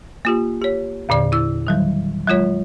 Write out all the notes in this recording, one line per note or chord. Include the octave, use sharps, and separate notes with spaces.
A#3 F4 G4
G4 C#5
E2 A#2 D3 D5
E4 E6
D#3 F#3 G3
F#3 G#3 F4 C#5